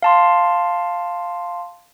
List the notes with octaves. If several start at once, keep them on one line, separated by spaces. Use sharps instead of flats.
F5 A5 C6